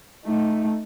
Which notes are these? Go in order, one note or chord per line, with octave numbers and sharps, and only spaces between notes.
A3 D#4